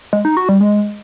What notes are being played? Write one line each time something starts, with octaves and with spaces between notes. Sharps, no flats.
G#3
D#4
F#4
G3
G#3